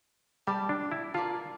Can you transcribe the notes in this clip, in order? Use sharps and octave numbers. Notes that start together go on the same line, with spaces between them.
G3 G4 D5 A5
D4
E4
F4 A#4 D5 F5 A5